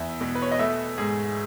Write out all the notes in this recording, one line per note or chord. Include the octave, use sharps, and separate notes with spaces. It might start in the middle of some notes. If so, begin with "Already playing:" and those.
Already playing: E2 E5
B2
B4
C#5
D#5
A3 E5
G#2 G#4